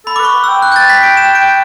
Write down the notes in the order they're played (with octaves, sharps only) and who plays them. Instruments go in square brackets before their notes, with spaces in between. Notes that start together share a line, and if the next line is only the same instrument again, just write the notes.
[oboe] A4 [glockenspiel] B5
[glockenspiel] D6
[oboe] B4 [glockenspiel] C#6
[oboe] F#5
[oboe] G5 [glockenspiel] E6
[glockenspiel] F#6
G6
A6
B6
D7
E7
D7